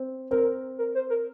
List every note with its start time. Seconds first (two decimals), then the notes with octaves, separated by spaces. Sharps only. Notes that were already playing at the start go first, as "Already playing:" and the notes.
Already playing: C4
0.31 C4 A#4
0.78 A#4
0.95 C5
1.10 A#4